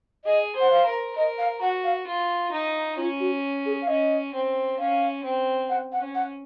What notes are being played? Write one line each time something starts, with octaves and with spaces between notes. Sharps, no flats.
G#4 D#5
C5 F#5
F5
A#4
A#4 D#5
F5
F#4 F#5
F5
F4
D#4
C#4 F4
F#4
G#4
F5
C#4 D#5
C4
C#4 F5
C4
F#5
F#5
C#4
F#5